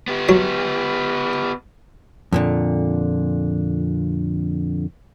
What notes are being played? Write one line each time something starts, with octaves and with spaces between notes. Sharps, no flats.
B3 G4
F#3
F2 A#2 D3